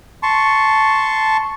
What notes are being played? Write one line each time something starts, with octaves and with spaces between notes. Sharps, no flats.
A5 C6 C#6